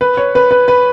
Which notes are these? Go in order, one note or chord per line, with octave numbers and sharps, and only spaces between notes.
B4
C#5
B4
B4
B4